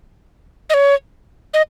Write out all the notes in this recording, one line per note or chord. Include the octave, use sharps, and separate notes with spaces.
D#5
C#5
D#5